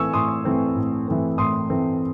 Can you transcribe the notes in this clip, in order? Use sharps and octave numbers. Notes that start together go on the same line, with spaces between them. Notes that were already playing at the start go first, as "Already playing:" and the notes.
Already playing: A2 E3 A3 C4 G#5 C#6 E6
A2 C6 D#6
E3 A3 C4
A2
E3 A3 C4
A2 C6 D#6
E3 A3 C4